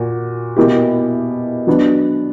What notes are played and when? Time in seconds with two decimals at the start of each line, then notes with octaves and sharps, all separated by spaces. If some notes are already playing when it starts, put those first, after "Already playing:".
Already playing: A#2 F#4
0.56 B2 A#3 E4 G4
1.67 F#3 B3 D4